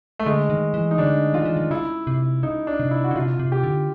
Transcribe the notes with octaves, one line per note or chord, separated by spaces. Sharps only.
A3
D3 G#3
D#3
E3
D#4
D3 D4
D#3 F4
E3
D#3
C#3 E4
C3
C#3 D#4
D4
C3
E4
F#4
C#3
C3 F4
C3
G4
D3